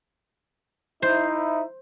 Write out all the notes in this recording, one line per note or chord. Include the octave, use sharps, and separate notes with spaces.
D#4 E4 C5